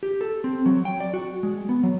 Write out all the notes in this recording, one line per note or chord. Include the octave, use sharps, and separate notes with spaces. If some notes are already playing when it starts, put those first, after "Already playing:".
G4
A4
C4
F#3
G5
D5
F#4
G#3
B3
F#3